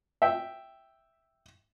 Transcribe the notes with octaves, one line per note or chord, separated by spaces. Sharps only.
E5 G5